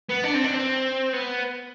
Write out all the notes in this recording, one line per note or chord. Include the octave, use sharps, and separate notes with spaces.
B3
D4
C4
D4
C4
B3